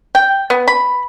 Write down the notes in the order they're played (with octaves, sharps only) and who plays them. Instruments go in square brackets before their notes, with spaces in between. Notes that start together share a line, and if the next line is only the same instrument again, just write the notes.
[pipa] G5
B3
B5